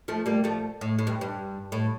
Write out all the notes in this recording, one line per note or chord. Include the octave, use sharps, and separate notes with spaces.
F3 A3
G3 A#3
F3 A3
A2
A2
G2
G2
A2